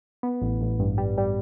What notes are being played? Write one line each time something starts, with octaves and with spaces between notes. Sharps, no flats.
B3
A1
A1
G2
G3
G3